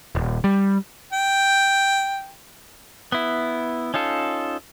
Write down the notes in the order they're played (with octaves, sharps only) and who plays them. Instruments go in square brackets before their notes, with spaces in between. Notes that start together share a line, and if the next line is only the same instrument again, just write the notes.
[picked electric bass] D#1
G3
[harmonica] G5
[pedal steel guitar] B3 E4
C#4 D#4 F4 A4